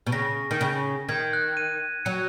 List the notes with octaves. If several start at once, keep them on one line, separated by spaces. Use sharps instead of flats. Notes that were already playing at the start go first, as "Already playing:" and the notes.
B2
C#3 A#6
D#3
C#3
D#3 G#6
F#6
D#7
F#3 C#7